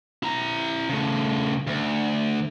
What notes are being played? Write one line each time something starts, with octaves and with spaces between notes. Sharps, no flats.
E4 A#5
C#3 A3
D2